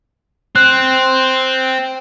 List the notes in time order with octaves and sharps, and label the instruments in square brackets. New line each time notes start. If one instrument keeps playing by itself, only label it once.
[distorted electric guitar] C4 [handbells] F#6